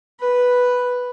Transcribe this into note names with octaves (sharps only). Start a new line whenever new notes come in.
B4